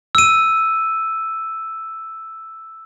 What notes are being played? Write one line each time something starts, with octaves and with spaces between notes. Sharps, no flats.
E6 D#7